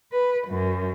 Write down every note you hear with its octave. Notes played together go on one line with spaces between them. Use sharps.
B4
F#2